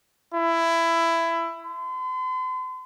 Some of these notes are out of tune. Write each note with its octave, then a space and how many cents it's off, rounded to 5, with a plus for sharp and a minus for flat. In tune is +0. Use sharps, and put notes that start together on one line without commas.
E4 +15
C6 -40